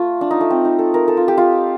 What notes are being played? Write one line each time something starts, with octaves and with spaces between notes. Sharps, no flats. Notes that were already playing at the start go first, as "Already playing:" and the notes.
Already playing: A3 F4
D4
D#4
A3
C4
D#4
A4
A#4
A4
F4
G4
F4